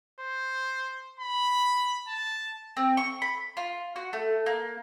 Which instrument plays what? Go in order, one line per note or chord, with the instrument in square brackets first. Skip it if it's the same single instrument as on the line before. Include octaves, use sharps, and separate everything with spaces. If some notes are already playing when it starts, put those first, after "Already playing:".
[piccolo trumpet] C5
B5
A5
[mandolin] C4
C#6
B5
F4
F#4
A3
A#3